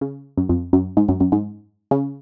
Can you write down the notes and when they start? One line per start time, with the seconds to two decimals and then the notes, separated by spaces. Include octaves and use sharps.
0.01 C#3
0.37 F#2
0.49 F2
0.73 F#2
0.97 G#2
1.09 F#2
1.20 F#2
1.32 G#2
1.91 C#3